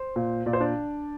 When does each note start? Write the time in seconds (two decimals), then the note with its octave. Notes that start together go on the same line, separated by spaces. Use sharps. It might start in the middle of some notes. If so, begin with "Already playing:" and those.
Already playing: C5
0.16 A#2
0.46 A#2 D5
0.53 C5
0.60 D4 D5